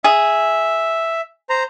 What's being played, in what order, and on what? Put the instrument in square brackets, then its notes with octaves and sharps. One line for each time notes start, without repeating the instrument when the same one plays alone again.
[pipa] G#4 [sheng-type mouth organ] E5
[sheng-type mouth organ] C5 A#5